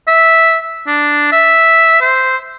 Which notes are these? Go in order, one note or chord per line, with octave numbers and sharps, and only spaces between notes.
E5
D4
E5
C5